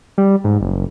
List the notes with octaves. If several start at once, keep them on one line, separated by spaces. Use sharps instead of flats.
G3
G#2
F#1